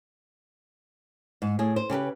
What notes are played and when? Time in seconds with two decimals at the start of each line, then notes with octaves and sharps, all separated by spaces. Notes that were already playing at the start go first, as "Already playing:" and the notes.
1.42 G#2
1.59 A2 G#4
1.76 C5
1.90 C#3 G4 A4 B4